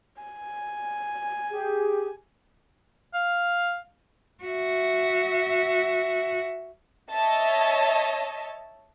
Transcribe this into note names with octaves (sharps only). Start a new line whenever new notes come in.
G#5
G4 G#4
F5
F#4 E5
C#5 D#5 E5 A5